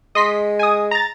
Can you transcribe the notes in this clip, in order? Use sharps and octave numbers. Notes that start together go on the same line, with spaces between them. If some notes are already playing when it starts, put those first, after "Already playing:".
G#3 D#5 C6 B6
G#5 D#6
A#5 A6